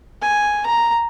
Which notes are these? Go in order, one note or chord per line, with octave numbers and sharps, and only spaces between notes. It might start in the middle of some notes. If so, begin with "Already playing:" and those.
G#5
A#5